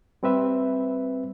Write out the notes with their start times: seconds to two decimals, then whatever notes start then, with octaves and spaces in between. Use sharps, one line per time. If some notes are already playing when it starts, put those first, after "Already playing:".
0.23 G3 C4 B4 E5